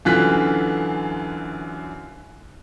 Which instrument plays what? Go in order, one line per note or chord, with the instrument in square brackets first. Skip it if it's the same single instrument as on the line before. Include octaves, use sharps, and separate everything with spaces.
[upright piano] F#2 D3 E3 F4 F#6 B6